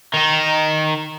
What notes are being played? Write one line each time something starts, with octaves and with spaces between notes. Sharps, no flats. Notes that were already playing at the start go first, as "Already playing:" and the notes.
D#3 D#4